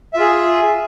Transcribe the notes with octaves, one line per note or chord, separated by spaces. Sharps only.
F4 G#4 E5